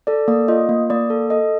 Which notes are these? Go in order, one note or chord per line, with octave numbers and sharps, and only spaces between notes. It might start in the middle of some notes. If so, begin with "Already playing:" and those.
A4 D5
A#3 D5
F4 D#5
A#3
A#3 D5
A4
A4 D#5